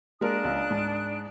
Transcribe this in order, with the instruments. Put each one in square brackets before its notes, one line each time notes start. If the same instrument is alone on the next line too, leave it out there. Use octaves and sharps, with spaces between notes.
[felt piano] G#3 A#3 A#4 [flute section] D4 D#6 F#6
[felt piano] C#2
G#2